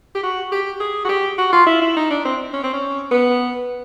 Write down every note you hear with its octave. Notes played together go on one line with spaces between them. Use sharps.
G4
F#4
G4
G#4
F#4
G4
F#4
F4
E4
E4
D#4
D4
C4
C#4
C4
C#4
B3